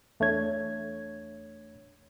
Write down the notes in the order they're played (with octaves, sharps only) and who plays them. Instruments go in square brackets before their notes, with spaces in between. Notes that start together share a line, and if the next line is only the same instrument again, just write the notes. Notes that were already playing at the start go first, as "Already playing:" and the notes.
[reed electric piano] E2 A3 D4 C#5 G#6